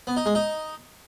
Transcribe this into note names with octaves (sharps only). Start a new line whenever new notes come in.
B3
D#4
G#3
D#4